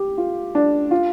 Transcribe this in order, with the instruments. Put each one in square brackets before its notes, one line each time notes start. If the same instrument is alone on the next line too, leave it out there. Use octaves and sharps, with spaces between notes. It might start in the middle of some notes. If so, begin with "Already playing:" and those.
Already playing: [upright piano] G4
F4
D4
F4